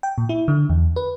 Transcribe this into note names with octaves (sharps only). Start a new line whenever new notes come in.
G5
A#2
E4
D3
E2
B4